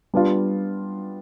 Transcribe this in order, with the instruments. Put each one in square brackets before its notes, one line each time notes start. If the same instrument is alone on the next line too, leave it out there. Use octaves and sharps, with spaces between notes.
[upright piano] G3 B3 D4 F4